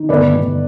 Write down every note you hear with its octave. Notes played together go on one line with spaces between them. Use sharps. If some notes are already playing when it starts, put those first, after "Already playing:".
Already playing: D#3
G1 B4 D5
G1